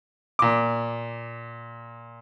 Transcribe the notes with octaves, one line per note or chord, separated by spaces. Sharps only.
A#2 D6